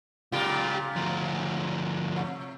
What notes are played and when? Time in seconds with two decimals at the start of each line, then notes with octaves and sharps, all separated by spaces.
0.32 C#2 A#2 C#3 F4 G4
0.96 D2 F3
2.16 C3